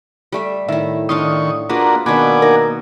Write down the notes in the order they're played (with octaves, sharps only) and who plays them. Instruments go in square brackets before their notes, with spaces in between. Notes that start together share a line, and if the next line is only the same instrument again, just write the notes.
[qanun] G3 A3 E5
[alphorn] A2 [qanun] D#3 E4 [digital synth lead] E5
[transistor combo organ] D#3 C#6 [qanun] D4 F5 C6 [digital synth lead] D#6
[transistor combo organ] A#3 D4 F#4 [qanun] F4 G#4 B4 [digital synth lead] A#5
[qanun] B2 D#3 D4 [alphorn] A#3 [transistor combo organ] F#5 G#5 D6 [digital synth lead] B5
[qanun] D#4 [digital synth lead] A#4